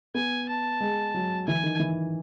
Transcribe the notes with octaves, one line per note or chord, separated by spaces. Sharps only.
B3 G#5
A5
G#3
F#3
E3 G#5
D#3
E3